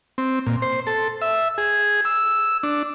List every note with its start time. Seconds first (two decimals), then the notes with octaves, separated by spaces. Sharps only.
0.18 C4
0.47 A#2
0.62 C5
0.87 A4
1.22 E5
1.58 G#4
2.05 E6
2.63 D4